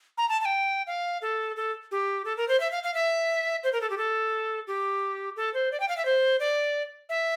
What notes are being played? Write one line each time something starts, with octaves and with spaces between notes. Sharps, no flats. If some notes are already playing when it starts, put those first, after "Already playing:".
A#5
A5
A5
G5
F5
A4
A4
G4
A4
A#4
C5
E5
F5
F5
E5
C5
A#4
A4
G4
A4
G4
A4
C5
D5
G5
F5
E5
C5
D5
E5